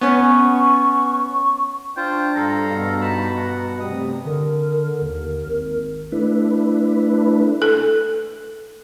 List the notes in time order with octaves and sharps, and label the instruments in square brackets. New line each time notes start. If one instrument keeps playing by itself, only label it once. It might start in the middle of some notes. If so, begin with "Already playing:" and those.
[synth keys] B3 C#4 [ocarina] C#6
[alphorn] D4 [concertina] F4 C5 [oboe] G5
[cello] G2 [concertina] A4 F5 [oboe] A#5
[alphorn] B2
[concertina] D#4 A5 B5
F#5
[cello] C3 A3 [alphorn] G3 [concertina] D#6
[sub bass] D3 [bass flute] A#4
[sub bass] D#2 [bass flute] A#4
[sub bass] G#1
[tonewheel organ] A3 D4 E4 B4
[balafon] A4